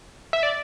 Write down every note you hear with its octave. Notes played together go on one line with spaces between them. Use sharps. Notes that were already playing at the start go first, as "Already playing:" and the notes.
E5
D5